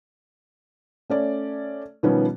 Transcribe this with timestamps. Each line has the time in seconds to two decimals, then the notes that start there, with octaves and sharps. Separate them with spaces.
1.10 A3 C#4 D5
2.03 B2 D#3 F3 G3 B3 C#4